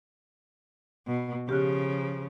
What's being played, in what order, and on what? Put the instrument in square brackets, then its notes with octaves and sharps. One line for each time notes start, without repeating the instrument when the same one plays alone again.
[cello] B2
[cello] C#3 F3 [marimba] G4 F6 F#6